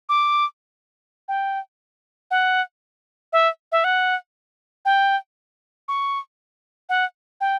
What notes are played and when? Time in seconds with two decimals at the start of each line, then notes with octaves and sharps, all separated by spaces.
0.09 D6
1.28 G5
2.31 F#5
3.33 E5
3.72 E5
3.84 F#5
4.85 G5
5.88 C#6
6.89 F#5
7.41 G5